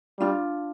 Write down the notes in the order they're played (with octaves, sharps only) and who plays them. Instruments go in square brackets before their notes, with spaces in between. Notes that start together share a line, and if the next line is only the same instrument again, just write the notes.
[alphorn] G3 [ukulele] D4 F4